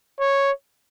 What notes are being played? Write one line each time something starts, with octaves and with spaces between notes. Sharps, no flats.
C#5